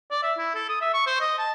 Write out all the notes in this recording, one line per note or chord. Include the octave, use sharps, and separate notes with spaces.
D5
E5
E4
A4
D#6
E5
C#6
C5
D#5
A5